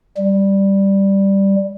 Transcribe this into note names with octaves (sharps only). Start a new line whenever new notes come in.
G3